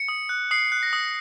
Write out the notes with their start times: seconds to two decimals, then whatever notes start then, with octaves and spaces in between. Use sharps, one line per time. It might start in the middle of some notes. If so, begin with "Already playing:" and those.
Already playing: C#7
0.08 D#6
0.29 F#6
0.51 D#6 C7
0.72 F#6
0.83 A#6
0.93 D#6